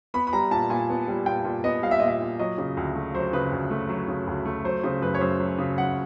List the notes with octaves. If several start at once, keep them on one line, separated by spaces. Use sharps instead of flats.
B3 B5
B5
G3 A#5
A#2 A5
A#2 G#5
B3
G3
A#2 G5
A#2
B3 D#5
G3 F5
E5
A#2 D#5
E5
A#2
F#3 D#5
C#3
D2
A3
F#3 C5
C#3 B4
D2
A3
F#3
C#3
D2
A3
F#3 C5
C#3 C5
F#2 B4
C#5
F#2 C5
F#3
C#3
F#2 F#5